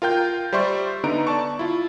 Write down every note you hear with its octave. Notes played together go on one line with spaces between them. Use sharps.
F4 A#4 G5 G6
G3 C5 D5 E5 C6 C#6
D3 B3 D#4 A#5 D7
D5 A5 C#6
E4 F4